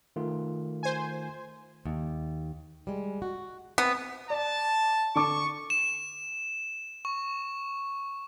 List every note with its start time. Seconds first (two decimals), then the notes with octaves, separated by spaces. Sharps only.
0.16 D#3 A3 F4
0.83 C5 G#5
1.86 D#2
2.87 G3 G#3
3.22 F#4
3.78 B3 C4
4.30 D5 A5
5.15 D3 A5 C#6 D6
5.70 E7
7.05 C#6